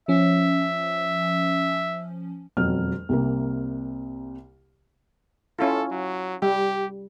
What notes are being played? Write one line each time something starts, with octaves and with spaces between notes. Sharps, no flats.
F3 C#4 E5
E1 F2 F#3 F6
C2 C3 A#3
C#4 E4 F4 A4
F#3
G3 G4